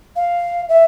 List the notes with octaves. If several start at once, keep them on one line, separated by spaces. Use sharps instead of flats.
F5
E5